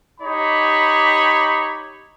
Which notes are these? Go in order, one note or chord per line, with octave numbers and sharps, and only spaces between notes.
D#4 G4 C#5 B5